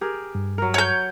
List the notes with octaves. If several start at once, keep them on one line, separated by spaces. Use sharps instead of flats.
G4 G#4 A#4
G2
F#3 A#4
C#5 E5 F#5 G6